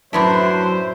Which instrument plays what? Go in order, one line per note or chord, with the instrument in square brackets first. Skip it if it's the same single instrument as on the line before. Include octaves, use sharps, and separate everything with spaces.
[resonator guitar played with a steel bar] F#2 A2 D4 [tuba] F#3 [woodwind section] B4 E5 [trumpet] C5